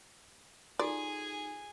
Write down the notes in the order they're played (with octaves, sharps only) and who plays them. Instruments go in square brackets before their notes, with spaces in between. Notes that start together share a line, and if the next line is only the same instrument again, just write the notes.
[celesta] D#4 [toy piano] F4 F#4 A4 [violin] G#4 G#5 [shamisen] D5